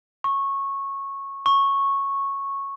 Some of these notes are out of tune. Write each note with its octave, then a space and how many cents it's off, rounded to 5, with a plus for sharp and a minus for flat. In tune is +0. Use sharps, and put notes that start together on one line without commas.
C#6 -15
C#6 -10